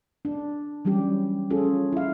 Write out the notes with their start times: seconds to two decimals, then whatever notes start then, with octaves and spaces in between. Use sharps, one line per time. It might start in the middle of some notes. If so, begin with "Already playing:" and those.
0.25 D4
0.85 E3 F#3 G3 C#4 G4
1.50 C#4 F4 G#4 A4
1.92 E4 F5